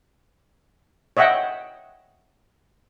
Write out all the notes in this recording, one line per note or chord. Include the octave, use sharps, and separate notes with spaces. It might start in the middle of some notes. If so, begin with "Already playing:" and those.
C#5 D#5 E5 F#5 G5